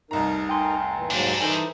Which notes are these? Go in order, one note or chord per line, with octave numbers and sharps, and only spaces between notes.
F1 C2 D#4 A#4 A#5
G5 G#5 C6
A#2 E3
G#2 F#3 G3 A#3 D4
E3 D#4 A4 A#4 C5 G#5